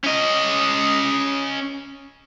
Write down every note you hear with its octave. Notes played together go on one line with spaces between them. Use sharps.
C#4 D#5